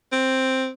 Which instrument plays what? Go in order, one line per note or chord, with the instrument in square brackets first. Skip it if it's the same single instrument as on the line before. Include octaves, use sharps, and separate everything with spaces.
[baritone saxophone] C4